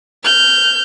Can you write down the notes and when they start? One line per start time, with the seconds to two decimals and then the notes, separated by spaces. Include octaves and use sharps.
0.24 F6 G6